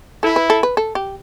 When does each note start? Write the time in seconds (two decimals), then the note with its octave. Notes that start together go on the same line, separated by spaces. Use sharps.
0.23 E4 A4
0.36 B4
0.50 A4
0.63 B4
0.77 A4
0.95 G4